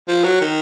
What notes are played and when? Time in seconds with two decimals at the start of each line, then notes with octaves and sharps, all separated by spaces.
0.08 F3
0.24 F#3
0.41 D#3